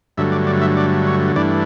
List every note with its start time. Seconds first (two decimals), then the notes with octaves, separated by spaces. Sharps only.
0.17 G2 D3 F#3 A3 E5
0.32 D5
0.47 D5
0.61 E5
0.77 D5
1.07 C#5
1.36 G2 E3 A3 D4 D5